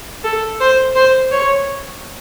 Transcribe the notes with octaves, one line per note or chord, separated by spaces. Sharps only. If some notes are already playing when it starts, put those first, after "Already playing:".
A4
C5
C5
C#5